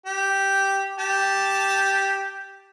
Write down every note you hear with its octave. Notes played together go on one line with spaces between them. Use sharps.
G4
G4 A5